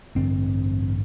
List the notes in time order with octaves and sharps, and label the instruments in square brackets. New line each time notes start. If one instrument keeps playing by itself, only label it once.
[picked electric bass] A1 G2 D3 C4